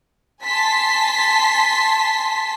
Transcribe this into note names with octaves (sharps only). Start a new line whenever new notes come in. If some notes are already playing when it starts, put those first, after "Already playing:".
G#5 A5 C6 B6 C7